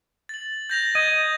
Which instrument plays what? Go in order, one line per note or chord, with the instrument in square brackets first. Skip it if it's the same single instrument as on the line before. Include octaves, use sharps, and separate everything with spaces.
[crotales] A6 F#7
G6 A#6 F7
[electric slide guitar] D#5 [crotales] G#6 A6